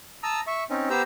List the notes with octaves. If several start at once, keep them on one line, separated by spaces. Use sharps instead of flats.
A5 A#5 D#6 E6
E5 C#6
C4 C#4 D#4
B3 G4 C5 A#5 E6 G6